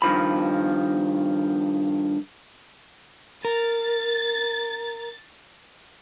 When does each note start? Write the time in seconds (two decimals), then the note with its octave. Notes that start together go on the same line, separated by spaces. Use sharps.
0.02 G2 D#3 F3 B5
3.45 A#4 A6